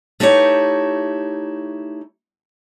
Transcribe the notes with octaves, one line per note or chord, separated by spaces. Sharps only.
A3 D#4 E4 G4 C#5